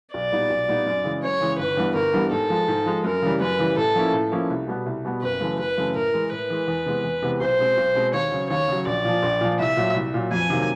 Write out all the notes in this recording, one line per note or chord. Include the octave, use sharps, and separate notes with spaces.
B1 D5
A#2 G3 B3 D#4
B1
A#2 G3 B3 D#4
F#2
C#3 E3 G#3
F#2 C#5
C#3 E3 G#3
G1 B4
G2 E3 G3 B3
G1 A#4
G2 E3 G3 B3
G#2 A4
F3 G#3
G#2
F3 G#3
F#2 A#4
C#3 E3 G3
F#2 B4
C#3 E3 G3
A2 A4
F3 A#3 C#4 E4
A2
F3 A#3 C#4 E4
C2
B2 G3 B3
C2
B2 G3 B3
F#1 B4
F#2 C#3 E3 A3
F#1 B4
F#2 C#3 E3 A3
A2 A#4
E3 G#3
A2 B4
E3 G#3
E2
C3 E3 G#3 B3
E2
C3 E3 G#3 B3
B1 C5
B2 G#3 C4
B1
B2 G#3 C4
D#2 C#5
C#3 F#3
D#2 C#5
C#3 F#3
A#1 D5
A#2 F3
A#1
A#2 F3
C2 E5
A#2 F#3
C2
A#2 F#3
F2 G#5
C3 D#3 F#3 A#3